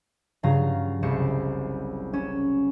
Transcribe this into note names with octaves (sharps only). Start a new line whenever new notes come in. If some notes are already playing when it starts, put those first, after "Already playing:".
G2 C#3 F#3 F4 F5 A#5
F#1 C2 F#3 C5 C#7 E7
C#4 E7